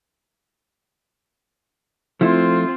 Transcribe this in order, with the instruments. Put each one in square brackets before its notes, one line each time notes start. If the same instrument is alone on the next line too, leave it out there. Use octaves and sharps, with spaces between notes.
[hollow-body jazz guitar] F3 A3 E4 [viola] C4 F4